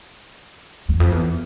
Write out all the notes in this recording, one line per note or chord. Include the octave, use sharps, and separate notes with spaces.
E2
F2
E2